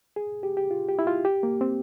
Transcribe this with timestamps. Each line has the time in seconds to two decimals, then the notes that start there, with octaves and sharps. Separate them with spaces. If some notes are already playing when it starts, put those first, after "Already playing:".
0.16 G#4
0.43 G4
0.57 G4
0.71 F4
0.89 G4
0.99 E4
1.07 F4
1.25 G4
1.43 A#3
1.61 C4